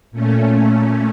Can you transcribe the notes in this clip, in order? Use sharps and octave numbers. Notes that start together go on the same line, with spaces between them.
A#2 A3 C#4